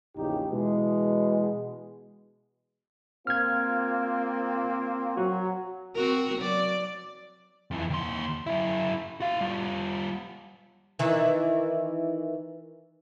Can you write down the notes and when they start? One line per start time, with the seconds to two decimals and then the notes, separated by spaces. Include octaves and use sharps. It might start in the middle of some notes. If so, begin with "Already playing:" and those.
0.17 A#1 E2 C#3 D#4 G4
0.50 B2 E3 G#3
3.27 A#3 C4 F4 F6 G#6
5.17 F#3 F#4
5.95 C4 F#4 A#4
6.37 F#3 D5
7.71 F2 E3
7.90 D#2 C6
8.47 F#2 E4
9.20 F#4 F5
9.41 G3 F4
10.99 D#3 E3